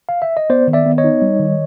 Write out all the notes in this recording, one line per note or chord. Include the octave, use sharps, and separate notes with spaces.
F5
E5
D#5
B3 C5 D5
D#3
D5 E5
B3
C#5 D#5
D#4
G3
D#3